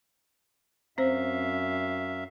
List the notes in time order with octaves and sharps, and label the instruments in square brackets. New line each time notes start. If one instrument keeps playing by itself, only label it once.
[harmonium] F#2 E5 F5 [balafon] C4 C5